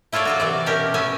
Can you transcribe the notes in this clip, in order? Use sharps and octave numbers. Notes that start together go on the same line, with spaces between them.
E4 F4 A4 C#5 D5
F#3 F4 F#4
C3 E3 D5
B2 C#4 G4 A#4
B3 C#4 E5 G#5